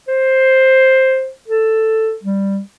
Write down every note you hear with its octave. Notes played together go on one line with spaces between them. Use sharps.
C5
A4
G3